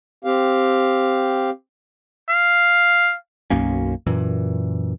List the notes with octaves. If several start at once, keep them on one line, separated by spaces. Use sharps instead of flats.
C4 G4 F5
F5
B1 F#2 A#3 C#4
F#2 A#2 E3